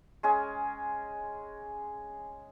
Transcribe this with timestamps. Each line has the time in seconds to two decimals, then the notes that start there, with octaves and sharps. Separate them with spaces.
0.23 G#3 C#4 G#4 G#5